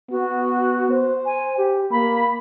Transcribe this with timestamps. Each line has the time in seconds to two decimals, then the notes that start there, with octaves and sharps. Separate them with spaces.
0.10 B3 F#4
0.90 C5
1.25 G#5
1.57 G4
1.91 A#3 B5